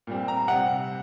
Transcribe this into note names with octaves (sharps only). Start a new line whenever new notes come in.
A#2 G3 C4
A#5
C3 G3 C4 F#5